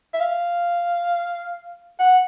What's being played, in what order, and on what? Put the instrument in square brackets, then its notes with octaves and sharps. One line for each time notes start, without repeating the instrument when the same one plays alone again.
[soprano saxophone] E5
F5
F#5